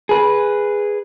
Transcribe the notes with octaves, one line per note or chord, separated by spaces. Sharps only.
G#4 B4